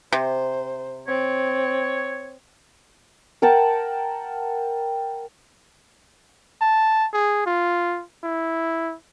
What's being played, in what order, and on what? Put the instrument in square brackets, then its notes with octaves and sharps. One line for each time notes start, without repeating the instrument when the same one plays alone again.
[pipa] C3 [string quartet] C5
[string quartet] C4 [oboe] C#5
[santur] A#4 F#5 G5 A5
[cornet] A5
G#4
F4
E4